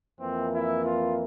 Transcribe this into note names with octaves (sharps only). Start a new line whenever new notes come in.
F2 E3 A#3 C4
E4
F4